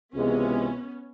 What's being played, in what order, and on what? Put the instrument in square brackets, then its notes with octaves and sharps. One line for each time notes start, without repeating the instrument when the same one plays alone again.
[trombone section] C#2 C3 E3 G#3 [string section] B3 C#4